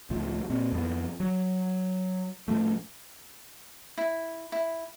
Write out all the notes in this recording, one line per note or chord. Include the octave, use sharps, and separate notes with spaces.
C#2 A2 F3
A#2 C4
F2 F3 B3
F#3
A2 F3 A3
E4
E4